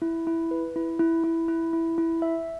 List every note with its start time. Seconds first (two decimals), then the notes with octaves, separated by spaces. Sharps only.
0.02 E4
0.27 E4
0.51 B4
0.76 E4
0.99 E4
1.24 E4
1.48 E4
1.73 E4
1.98 E4
2.22 E5